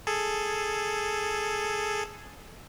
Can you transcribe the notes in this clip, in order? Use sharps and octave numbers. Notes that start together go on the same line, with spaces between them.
G#4 A4